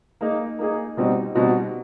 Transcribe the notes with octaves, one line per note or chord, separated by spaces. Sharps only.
A#3 D#4 G#4
A#3 D#4 G#4
B2 G3 C4 D#4 F#4
B2 G3 C4 D#4 F#4